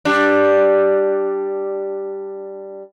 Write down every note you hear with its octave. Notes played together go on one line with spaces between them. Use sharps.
G3 D4